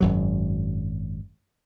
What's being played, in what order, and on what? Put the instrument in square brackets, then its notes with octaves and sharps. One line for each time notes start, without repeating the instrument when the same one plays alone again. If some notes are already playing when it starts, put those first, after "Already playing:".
[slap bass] G#1 F#2 F#3